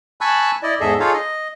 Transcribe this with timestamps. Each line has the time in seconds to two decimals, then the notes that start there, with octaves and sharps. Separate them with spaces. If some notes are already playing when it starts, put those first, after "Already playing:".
0.21 G#5 A5 B5 C#6 E6 F#6
0.63 E4 D5 D#5
0.81 E2 G#2 G#4 A4 D#5 E5
1.00 D#4 F4 G#4 A4 C#5 F5
1.13 D#5